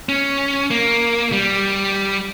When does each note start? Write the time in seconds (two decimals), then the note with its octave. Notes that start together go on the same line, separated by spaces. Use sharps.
0.09 C#4
0.71 A#3
1.32 G3